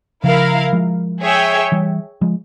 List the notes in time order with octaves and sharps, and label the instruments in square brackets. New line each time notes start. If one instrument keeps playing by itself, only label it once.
[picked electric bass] C#3 F3 [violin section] E4 A#4 F5
[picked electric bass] F3 G#3
[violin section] G#4 C#5 E5 G5
[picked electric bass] E3 G3
F3 G#3